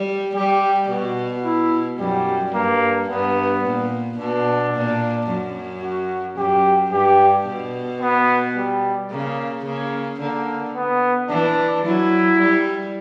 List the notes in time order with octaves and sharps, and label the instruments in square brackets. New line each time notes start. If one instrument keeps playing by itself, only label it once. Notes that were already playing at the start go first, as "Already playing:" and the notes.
Already playing: [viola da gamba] G3
[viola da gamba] G3 [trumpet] G4
[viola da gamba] B2 [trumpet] F#4
[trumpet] E4
[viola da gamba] F#2 [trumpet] G3
[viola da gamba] G2 [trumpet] A#3
[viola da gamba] G2 [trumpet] B3
[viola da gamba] A#2
[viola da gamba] B2 [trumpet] D4
[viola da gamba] A#2
F#2
[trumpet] F#4
[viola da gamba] F#2 [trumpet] G4
[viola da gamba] G2 [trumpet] G4
[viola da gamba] B2
[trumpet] B3
G3
[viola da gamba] C#3 [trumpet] A#3
[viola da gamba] C#3 [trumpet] A#3
[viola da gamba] D3 [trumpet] A#3
[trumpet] B3
[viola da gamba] E3 [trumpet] D4
[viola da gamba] F#3 [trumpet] E4
[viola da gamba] G3